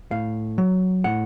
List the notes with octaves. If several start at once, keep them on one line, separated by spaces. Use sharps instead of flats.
A2 F5
F#3
A2 F#5